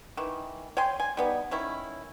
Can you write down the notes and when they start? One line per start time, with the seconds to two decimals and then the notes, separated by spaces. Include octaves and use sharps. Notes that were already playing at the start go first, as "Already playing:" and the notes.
0.17 D#3 E3
0.77 C#5 G5 G#5 C6
1.00 G#5
1.17 G3 B3 D#4
1.51 D#3 C#4 E4